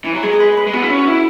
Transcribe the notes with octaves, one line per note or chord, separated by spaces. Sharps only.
E3
F#3
G#3 G#4
G#4
B4
B4
G#3
B3 F#4
E4
C#4
B4
E4